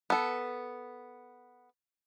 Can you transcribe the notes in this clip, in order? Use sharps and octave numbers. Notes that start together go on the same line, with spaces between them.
B3 A4